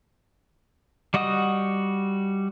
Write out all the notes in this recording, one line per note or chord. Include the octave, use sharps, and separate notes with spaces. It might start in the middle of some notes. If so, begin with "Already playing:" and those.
G3 F#4 D#5 F#5 D#6